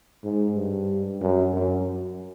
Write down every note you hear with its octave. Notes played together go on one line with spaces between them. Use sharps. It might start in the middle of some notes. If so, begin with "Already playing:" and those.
G#2
G2
F#2
F#2